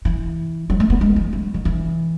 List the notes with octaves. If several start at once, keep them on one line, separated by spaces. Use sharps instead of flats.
E3
F#3
A3
B3
G#3
E3
F#3
D#3
E3